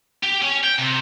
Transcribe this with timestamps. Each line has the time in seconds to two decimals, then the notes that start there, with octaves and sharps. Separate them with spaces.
0.23 G4
0.42 C#4
0.63 G5
0.78 C3